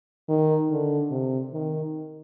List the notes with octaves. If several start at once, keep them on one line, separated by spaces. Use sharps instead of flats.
D#3
D3
C3
D#3